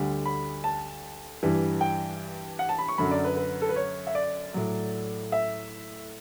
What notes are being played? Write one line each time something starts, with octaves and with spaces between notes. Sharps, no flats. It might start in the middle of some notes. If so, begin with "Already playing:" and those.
Already playing: D2 D3 G3
B5
A5
G2 E3 G3
G5
F#5
A5
B5
C#6
F#2 D3 F#3 B5
D5
B4
B4
A4
B4
C#5
E5
D5
A2 F#3
E5